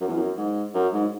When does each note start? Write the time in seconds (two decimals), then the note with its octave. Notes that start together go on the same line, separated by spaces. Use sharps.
0.01 F#2
0.08 E2
0.17 F#2
0.37 G#2
0.74 F#2
0.93 G#2